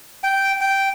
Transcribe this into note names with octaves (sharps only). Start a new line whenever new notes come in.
G5
G5